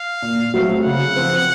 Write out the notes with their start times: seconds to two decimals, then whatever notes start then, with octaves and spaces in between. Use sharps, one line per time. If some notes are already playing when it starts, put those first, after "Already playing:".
Already playing: F5
0.22 A#2
0.54 F#3 A3 C4
0.84 C#3 F#5
1.16 F3 C4 F4